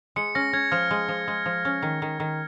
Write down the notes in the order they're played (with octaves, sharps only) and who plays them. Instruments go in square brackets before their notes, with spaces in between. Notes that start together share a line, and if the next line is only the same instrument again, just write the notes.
[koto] G#3 [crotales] C#7
[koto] C#4 [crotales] A#6
[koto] C#4 [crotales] G#6
[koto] F3 [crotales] F6
[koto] G#3
F3
G#3
F3
C#4
D#3
D#3
D#3